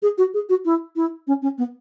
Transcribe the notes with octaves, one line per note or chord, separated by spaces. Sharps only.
G#4
F#4
G#4
F#4
E4
E4
C#4
C#4
B3